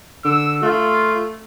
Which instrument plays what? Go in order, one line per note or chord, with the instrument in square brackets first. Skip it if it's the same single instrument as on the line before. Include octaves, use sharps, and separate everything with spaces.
[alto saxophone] D3 [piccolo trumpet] E6
[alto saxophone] A3 [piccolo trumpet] F4